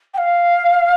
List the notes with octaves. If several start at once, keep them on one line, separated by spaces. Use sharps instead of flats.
G5
F5